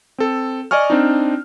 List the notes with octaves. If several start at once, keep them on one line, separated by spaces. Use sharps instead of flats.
C4 A4
D5 D#5 G#5 C#6 F6
C4 D4 D#4